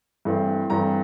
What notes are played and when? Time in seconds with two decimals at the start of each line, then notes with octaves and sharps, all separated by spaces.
0.25 G2 E3 A3 C4
0.70 G2 E3 A3 C4 A#5